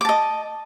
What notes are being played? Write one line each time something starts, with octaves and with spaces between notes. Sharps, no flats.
D#5 A5 D6